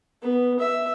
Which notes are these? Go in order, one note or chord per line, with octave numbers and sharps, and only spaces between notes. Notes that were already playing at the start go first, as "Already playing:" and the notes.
B3
E5